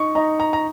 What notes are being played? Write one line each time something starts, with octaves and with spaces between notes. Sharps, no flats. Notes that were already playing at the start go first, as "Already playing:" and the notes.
Already playing: D#4 C#6
D#4 A#5
A#5
A#5